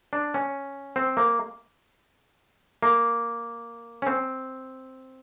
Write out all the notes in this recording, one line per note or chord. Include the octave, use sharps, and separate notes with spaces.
D4
C#4
C4
A#3
A#3
C#4
C4